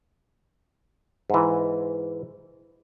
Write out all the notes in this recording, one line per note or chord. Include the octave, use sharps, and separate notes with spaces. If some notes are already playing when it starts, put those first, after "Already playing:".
G#2 E3